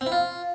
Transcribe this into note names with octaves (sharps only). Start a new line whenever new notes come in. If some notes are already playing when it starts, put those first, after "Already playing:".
C4
E4
F4